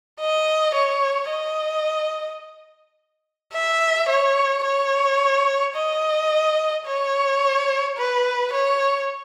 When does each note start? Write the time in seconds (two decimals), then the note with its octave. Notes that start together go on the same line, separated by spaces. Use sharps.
0.20 D#5
0.75 C#5
1.30 D#5
3.53 E5
4.09 C#5
4.65 C#5
5.76 D#5
6.87 C#5
7.97 B4
8.53 C#5